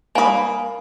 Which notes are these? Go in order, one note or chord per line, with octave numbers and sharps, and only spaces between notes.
A#3 G#5 B5 D#6